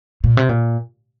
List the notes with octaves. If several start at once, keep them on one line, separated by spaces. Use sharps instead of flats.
A#2
C3
A#2